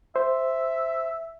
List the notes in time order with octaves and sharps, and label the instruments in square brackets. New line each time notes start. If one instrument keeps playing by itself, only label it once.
[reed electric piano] C5 [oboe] E5